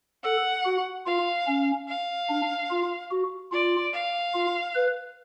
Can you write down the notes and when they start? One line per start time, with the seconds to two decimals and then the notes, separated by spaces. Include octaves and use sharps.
0.24 A4 F#5
0.65 F#4
1.06 F4 F5
1.47 C#4
1.88 F5
2.29 D4
2.70 F4
3.11 F#4
3.52 F4 D5
3.93 F5
4.34 F4
4.75 B4